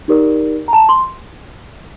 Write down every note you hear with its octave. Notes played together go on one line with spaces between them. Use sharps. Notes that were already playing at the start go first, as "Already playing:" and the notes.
D#4 G4 A#4 D5
A#5
A5
C6